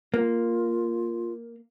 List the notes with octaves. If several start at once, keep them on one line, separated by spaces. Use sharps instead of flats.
A#3 F4